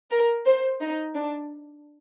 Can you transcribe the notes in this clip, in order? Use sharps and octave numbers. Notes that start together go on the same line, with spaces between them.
A#4
C5
D#4
D4